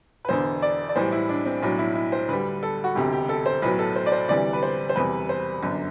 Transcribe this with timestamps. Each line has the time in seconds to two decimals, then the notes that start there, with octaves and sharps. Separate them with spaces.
0.25 B4
0.29 E1 E2 D3 C5
0.62 D5
0.89 D5
0.96 B1 A2 E3 G3 C5
1.12 E4
1.29 D4
1.46 C4
1.63 B1 A2 F#3 D4
1.79 E4
1.95 E4
2.12 C5
2.29 D2 D3 G3 B4
2.63 A4
2.84 F#4
2.95 E1 D2 C3 G4
3.13 G4
3.29 A4
3.46 C5
3.62 B1 A2 F#3 B4
3.79 A4
3.96 C5
4.06 D5
4.12 C5
4.29 D2 C3 E3 G3 D5
4.53 B4
4.63 C5
4.89 C5
4.96 E1 E2 C3 G3 B4
5.29 C5
5.63 G1 F#2 D3